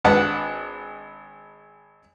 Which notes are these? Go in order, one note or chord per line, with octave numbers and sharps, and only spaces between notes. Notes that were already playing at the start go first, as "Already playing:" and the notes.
G#1 D4 B4 F#5 A5